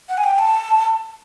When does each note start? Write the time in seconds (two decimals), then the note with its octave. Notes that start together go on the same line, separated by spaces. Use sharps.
0.09 F#5
0.18 G#5
0.24 G5
0.39 A5